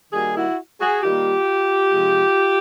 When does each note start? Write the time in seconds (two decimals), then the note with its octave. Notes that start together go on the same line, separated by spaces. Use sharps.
0.13 D#3 G3 A#3 F#4 G#4
0.36 E4 F#4
0.80 F#4 G#4
1.03 D#3 G3 A#3 F4 G4
1.92 C3 F3 G#3